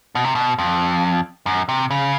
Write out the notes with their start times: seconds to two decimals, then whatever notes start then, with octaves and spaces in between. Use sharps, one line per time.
0.15 B2
0.24 C3
0.35 B2
0.59 F2
1.46 F#2
1.69 C3
1.90 C#3